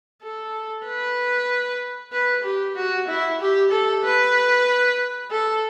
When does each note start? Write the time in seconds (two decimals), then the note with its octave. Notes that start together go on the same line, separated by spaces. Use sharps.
0.22 A4
0.85 B4
2.12 B4
2.44 G4
2.76 F#4
3.08 E4
3.40 G4
3.71 A4
4.03 B4
5.31 A4